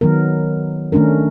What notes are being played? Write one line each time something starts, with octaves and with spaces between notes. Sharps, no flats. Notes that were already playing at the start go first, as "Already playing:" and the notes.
D#3 F#3 B3 A#4
D#3 A3 C#4 D4 A#4